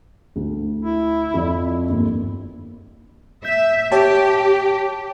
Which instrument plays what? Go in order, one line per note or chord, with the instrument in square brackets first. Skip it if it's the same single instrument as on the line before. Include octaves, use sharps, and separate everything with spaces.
[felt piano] D2
[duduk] E4
[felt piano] F2 F3 D5
G1 D#2
[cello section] E5 [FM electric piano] G6
[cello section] G4 [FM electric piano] C#5 G5 A5